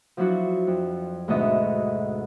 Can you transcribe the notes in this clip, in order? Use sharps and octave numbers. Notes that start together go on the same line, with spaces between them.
F3 F#3 D4 E4 F#4
F2
D2 G#2 B2 B3 D#5 E5